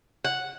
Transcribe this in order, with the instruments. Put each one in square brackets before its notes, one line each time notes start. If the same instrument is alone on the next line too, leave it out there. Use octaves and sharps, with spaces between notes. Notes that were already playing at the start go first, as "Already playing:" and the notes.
[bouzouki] F#5